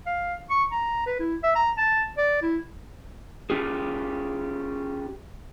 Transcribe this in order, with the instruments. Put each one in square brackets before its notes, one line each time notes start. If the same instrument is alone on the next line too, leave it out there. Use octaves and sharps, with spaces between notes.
[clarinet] F5
C#6
A#5
B4
E4
E5
A#5
A5
D5
E4
[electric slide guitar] C#4 F4 G4 G#4